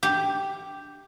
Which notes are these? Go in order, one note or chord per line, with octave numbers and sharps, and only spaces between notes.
G4